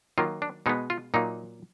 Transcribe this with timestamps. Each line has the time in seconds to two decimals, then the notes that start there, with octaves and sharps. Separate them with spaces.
0.18 D#3 F#3 A#3 F4
0.42 D4
0.66 B2 G#3 B3 D#4
0.90 F4
1.14 A#2 F#3 A#3 D#4